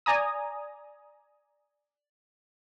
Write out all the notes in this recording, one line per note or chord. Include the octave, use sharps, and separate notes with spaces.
D5 G#5 A#5 D#6